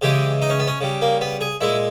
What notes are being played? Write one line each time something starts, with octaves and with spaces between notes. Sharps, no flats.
C#3 E3 G#3 G4
D#4
C#4
B3
C#4
C#3 G3
A#3
B3
G#4
A#2 G#3 E4